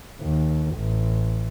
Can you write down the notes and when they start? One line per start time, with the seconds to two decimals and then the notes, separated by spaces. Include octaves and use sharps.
0.22 D#2
0.76 A1